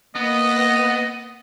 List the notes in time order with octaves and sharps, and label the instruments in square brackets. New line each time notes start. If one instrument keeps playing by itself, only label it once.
[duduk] A#3 [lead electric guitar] B3 [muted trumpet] D#5